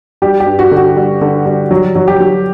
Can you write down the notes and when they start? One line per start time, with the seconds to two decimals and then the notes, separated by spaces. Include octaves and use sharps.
0.22 G3 G4
0.40 G4
0.46 G2
0.59 F#4
0.72 D3
0.77 F#4
0.96 G3
1.21 D3
1.46 G3
1.71 F#3
1.95 F#3
2.08 G4
2.20 F#3